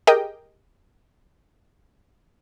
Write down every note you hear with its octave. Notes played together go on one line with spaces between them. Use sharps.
G4 G#4 A#4 D#5 G5